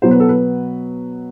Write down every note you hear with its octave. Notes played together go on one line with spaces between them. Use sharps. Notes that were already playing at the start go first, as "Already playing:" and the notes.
B2 F#3 B3 C5
B4
A4
B4